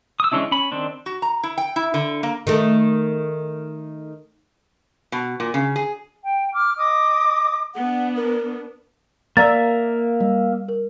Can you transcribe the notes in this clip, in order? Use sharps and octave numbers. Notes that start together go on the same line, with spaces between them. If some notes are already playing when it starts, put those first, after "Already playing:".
D#6 E6
E3 G#3 C#4 D4 E4
C#4 B5
D#3 C4 D4
F#4
A#5
E4
G5
E4
D3
A#3
D#3 A3
B2
A#2
C#3
G#4
G5
D6 F6
D#5 D6 D#6
B3 D4 F#5
A#4
A#3 D5 E5 A#5 A6
G3
A#4